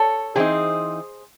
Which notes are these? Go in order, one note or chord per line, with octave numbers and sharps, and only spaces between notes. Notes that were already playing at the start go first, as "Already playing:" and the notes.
Already playing: A4 C#5
E3 C4 D#4 G#4 C5